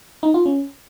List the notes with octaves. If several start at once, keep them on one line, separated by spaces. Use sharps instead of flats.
D#4
F4
C#4